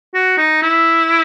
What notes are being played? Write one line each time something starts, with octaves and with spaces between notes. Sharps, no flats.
F#4
D#4
E4